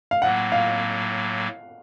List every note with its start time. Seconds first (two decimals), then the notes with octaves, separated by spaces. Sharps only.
0.11 F5
0.22 A2 F#3 A#3 F#5
0.52 F5